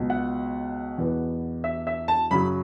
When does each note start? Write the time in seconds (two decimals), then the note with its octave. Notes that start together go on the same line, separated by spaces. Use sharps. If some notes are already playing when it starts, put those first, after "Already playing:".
Already playing: C#2 B2 F#3
0.10 F#5
0.98 E2 B2 B3
1.64 E5
1.87 E5
2.08 A5
2.31 F#2 C#3 F#3 B5